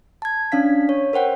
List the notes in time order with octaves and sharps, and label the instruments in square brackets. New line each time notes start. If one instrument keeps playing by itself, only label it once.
[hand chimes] A5 G#6
C#4 D4 F5 B6
C#5
A#4 C5 F#5 G5